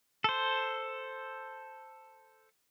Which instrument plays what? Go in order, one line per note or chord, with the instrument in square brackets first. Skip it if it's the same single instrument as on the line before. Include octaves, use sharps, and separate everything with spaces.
[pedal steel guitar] A4 C5